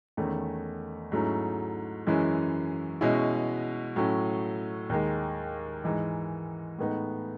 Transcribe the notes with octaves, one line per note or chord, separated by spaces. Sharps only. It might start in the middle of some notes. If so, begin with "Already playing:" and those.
E2 D#3 A3 C#4
G#2 F#3 A3 C#4 E4
F#2 E3 G#3 C#4 E4
B2 G#3 C#4 E4
A2 F#3 C#4 E4
D#2 D#3 G#3
G#2 E3 G#3 D#4
A2 G#3 B3 D#4